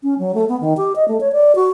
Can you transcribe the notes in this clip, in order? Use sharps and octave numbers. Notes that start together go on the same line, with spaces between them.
C#4
F#3
A3
B3
D#3
G4
D#5
A3
C#5
D5
F#4